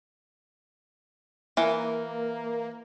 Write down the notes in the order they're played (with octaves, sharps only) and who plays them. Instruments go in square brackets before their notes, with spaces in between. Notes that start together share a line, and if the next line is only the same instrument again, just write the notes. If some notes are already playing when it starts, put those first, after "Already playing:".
[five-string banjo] E3 [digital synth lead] A#3